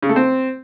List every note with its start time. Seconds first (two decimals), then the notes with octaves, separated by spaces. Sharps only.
0.03 C#3
0.09 A3
0.16 C4